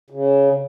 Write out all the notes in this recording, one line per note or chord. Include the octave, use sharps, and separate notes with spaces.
C#3